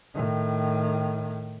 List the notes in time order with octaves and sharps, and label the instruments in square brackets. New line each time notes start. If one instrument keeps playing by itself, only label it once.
[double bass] A2 D#3